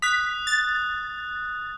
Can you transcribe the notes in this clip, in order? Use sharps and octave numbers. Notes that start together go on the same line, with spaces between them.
D#6 F#6 B6
A6